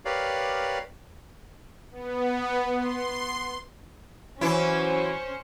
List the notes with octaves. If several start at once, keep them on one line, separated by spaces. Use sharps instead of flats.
G4 A#4 B4 C#5 D5 F5
B3
C6
E3 F#3 C#4 E4 C5